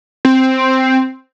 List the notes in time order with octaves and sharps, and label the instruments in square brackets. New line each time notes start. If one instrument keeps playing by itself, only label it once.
[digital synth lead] C4